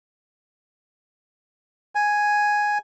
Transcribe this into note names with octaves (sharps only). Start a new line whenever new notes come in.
G#5